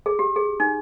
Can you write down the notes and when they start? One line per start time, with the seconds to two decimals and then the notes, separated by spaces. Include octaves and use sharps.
0.06 G#4
0.19 G4
0.36 G#4
0.60 D#4